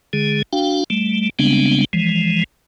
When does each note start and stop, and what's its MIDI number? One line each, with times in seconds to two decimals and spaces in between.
0.13 0.42 50
0.13 0.42 56
0.13 0.42 68
0.53 0.84 62
0.53 0.84 66
0.53 0.84 77
0.53 0.84 79
0.90 1.30 55
0.90 1.30 57
1.39 1.85 49
1.39 1.85 55
1.39 1.85 56
1.39 1.85 59
1.39 1.85 60
1.39 1.85 62
1.93 2.44 52
1.93 2.44 53
1.93 2.44 56